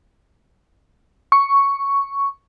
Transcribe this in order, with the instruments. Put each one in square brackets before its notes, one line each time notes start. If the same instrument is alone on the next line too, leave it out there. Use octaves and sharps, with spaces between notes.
[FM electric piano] C#6